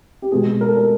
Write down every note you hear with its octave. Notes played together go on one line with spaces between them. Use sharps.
G4
B2 G#3 B3 G#4
A#4
A4
A#4